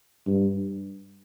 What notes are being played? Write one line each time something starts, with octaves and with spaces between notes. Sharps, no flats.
G2